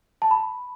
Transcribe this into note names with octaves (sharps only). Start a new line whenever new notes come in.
A5
B5